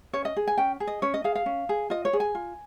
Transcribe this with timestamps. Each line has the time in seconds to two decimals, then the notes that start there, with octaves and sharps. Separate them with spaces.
0.13 C#4 C#5
0.25 D#5
0.37 G#4
0.48 G#5
0.58 C#4 G5
0.80 G#4
0.87 D#5
1.02 C#4 C#5
1.14 D#5
1.24 G#4 F5
1.35 F5
1.46 C#4
1.69 G#4
1.90 F4 D#5
2.05 C#5
2.13 G#4
2.20 G#5
2.35 F4